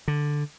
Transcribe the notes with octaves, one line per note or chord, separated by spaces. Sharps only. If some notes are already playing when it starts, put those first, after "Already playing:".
D3